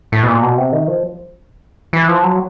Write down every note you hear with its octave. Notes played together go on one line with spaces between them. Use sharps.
A2
B2
A#2
B2
C3
D#3
F3
E3
F3
F#3